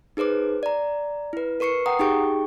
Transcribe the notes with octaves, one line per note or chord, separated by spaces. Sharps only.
D#4 G#4 B4 C5 D6
D5 A#5
E4 B4
A#4 B4 C#6 C7 C#7
F#5 G5 A#5 D#6
D#4 G4 G#4 G5 C#6